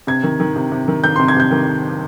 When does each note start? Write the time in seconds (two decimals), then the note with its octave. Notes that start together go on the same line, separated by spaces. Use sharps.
0.07 C3 G#6
0.23 D#3
0.40 D#3
0.56 C3
0.72 C3
0.88 D#3
1.04 D#3 G6
1.16 C6
1.20 C3
1.28 G#6
1.36 C3 G6
1.51 D#3